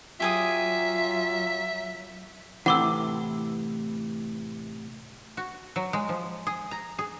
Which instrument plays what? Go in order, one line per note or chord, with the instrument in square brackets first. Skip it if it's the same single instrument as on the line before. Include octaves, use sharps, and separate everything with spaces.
[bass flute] F#3 [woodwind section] F4 [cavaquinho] G4 G#4 D#6 [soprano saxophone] E5
[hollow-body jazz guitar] A2 C3 E3 [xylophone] F#5 D6 E6
[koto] F#4
F#3
G#3
F3
G#4
A#5
G#4